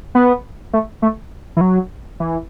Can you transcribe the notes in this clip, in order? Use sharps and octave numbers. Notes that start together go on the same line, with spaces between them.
B3
A3
A3
E3
F#3
E3